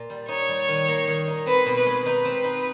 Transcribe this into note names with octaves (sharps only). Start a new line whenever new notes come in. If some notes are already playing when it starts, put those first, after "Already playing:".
Already playing: A#2
G3
D#4 C#5
G3
D#3
A#3
D#3
D#4
C4 B4
B2
B4
G#3
D#4 B4
C4
D#4